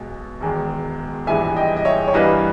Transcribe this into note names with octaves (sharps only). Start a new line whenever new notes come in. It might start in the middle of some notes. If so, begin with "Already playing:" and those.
Already playing: B1 B2 G#3
E1 E2 D#3 G#3
A#1 G#2 E3 G3 E5 G#5
D#5 G5
D#5
C#5 E5
C#5
G2 E3 G3 A#3 B4 D#5